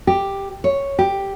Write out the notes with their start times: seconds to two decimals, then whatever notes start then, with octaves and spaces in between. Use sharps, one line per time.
0.07 G4
0.64 C#5
0.99 G4